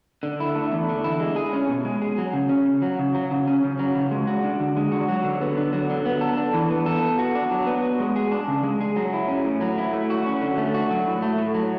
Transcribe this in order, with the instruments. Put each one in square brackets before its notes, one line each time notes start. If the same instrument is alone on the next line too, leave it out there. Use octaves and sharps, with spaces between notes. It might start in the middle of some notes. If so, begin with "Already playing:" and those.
[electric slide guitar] D3
E4
A3
E2
D3
E4
G#3
G#4
C#4
B2
G#3
G#4
F#3
C#3
C#4
C#3
F#3
C#3
F#3
C#3
C#4
C#3
F#3
C#3
G#3
F#4
D4
D3
G#3
F#4
F#3
D3
B3
D3
F#3
D3
B3
A4
D4
E3
B3
A4
B3
F#4
D4
F#3
B3
F#4
G#3
G#4
D4
C#3
G#3
G#4
F#3
E4
C#4
A2
F#3
E4
A3
F#4
C#4
D3
A3
F#4
F#3
A2
A3
A2
F#3